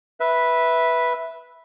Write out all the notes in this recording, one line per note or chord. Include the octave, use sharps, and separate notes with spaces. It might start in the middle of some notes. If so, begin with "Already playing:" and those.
B4 E5